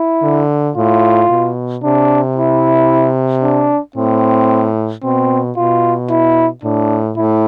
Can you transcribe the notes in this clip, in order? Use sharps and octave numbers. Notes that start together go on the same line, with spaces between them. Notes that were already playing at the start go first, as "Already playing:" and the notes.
Already playing: E4
D3
A2 F4
B2
C3 D4
E4
D4
A2 C4
B2 C4
B2 F4
E4
A2 D4
A2 E4